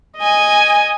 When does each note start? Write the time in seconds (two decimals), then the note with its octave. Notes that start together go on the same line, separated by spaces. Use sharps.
0.18 D#5 G#5